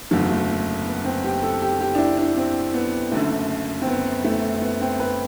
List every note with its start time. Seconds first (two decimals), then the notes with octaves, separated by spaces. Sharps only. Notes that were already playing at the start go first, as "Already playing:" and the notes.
0.11 F#1 E2 D3 F#3 A3
0.31 A3
0.86 B3
1.05 C4
1.24 G4
1.43 A4
1.62 G4
1.81 G4
1.95 D4
1.98 E4
2.17 D4
2.37 C4
2.74 B3
3.11 F#1 F#2 D3 A3
3.82 C4
3.87 B3
4.24 A3
4.62 B3
4.81 C4
5.00 B4